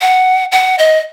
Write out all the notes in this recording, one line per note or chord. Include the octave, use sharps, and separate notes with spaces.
F#5
F#5
D#5